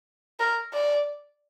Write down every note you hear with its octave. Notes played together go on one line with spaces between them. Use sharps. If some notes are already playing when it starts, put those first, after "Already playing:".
A#4
D5